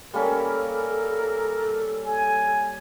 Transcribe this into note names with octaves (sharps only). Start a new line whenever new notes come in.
G3 A#3 C#4 A4 A#4
G#5